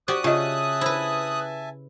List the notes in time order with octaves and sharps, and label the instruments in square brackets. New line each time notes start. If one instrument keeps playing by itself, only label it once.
[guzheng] F#4 G4 D5 [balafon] C5 [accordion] D#6 F#6
[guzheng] C#3 [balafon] F4 D#5 [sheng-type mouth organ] E5 G#5 A5
[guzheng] E4 B4 [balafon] C5